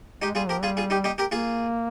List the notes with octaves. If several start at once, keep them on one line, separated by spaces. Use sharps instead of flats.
G#3 D#4 G4
G3 F4 G#4
F3 G4 A#4
G3 F4 G#4
F4 G#4
D#4 G4
D#4 G4
G4 A#4
A#3 F4 G#4